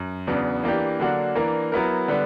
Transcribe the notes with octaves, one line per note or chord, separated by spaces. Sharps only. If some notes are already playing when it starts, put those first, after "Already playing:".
Already playing: F#2
E2 C#3 F#3 B3 D4
E3 A#3 D4 G4
D3 F#3 A#3 D4 F#4
E3 A#3 D4 A#4
F#3 B3 E4 A#4
D3 G3 B3